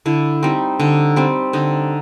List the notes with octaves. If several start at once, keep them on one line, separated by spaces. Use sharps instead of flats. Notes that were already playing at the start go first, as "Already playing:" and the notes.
D3 E4
G3 C4 D#4
D3 D#4
G3 C4
D3 D#4